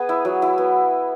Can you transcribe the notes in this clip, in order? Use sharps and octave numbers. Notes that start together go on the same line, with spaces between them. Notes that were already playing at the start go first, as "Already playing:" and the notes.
Already playing: B3 G#4 B4
E4
F#3
E4
B3